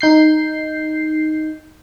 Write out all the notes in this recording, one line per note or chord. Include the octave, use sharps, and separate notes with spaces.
D#4 G6 C7